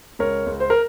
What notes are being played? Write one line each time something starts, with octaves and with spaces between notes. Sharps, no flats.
C#2 A#4 C#5
C#2
C5
A#4